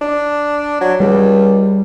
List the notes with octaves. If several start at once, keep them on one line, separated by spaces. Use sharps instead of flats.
D4
F#3
C#2 G3